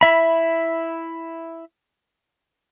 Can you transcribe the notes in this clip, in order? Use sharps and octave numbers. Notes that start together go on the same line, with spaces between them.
E4 E5 B5